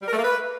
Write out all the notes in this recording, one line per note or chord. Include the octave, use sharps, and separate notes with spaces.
G3
A#4
A3
A#3
B4